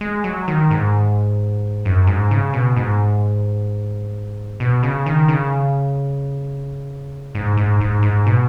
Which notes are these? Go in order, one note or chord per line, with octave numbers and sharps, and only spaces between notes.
G#3
F#3
D#3
G#2
F#2
G#2
C#3
B2
G#2
B2
C#3
D#3
C#3
G#2
G#2
G#2
G#2
B2